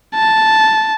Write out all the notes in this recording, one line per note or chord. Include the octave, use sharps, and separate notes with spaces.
A5